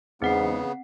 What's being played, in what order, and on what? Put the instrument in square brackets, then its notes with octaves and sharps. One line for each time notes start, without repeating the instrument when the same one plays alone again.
[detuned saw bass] E2 [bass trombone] G#2 [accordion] C#3 B3 [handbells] C4 F#5 C7